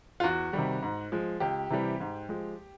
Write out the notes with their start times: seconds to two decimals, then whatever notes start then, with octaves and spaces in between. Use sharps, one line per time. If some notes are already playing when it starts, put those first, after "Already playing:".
0.20 F4
0.23 E2 F#4
0.53 C3 D#3 G3
0.83 G#2
1.12 F3 G#3
1.40 C#2 G4
1.70 C3 E3 G3
2.00 G#2
2.29 F3 G#3